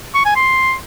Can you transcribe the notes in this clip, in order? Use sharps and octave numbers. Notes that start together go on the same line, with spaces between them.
C#6
G#5
C6